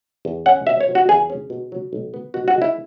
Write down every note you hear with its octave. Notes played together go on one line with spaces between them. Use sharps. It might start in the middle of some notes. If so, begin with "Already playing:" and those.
E2
C#4 F#5
B2 E5
C#5
F#3
F#4
E2 G#4
C#4
B2
F#3
B1
B3
B2 F#4
F#4
G#3
E4